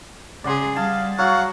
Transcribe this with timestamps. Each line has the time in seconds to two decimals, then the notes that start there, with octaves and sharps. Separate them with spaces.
0.44 C#3 G#4 D5 F#5 C6
0.76 G3 G#4 F5 A5
1.18 F#3 F#4 F5 F#5